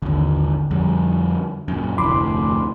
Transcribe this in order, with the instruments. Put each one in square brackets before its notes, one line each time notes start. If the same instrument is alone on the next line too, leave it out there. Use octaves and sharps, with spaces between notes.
[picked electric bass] G#1 D#2 [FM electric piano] D3
[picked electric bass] F2 G3
F#2 A#2
[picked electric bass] F1 D2 A2 [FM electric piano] B5 C6 D6